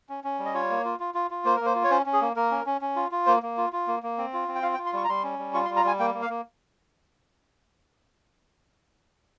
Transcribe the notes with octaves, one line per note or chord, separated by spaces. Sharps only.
C#4
C#4
G3
D#5
F4 C#5
A#3
F4
F4
F4
F4
A#3 C5
A#3 A#4
C5
F4
C#5
C#4 C5
C#4
G#4
A#3
A#3 A#4
C#4
C#4
C#4
F4
F4
A#3 C5
A#3
F4
F4
A#3
A#3
C4
F4
C4
G5
F4 F5
G5
F4
C6
G3 C#6
A#5
G3 C6
C#4
G3
F4 C#6
C6
G3
A#5
G3 G#5
A#3 G5
A#3
F5
A#3